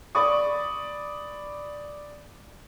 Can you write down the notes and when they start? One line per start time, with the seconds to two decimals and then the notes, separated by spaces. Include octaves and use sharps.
0.15 D5 B5 C#6 D#6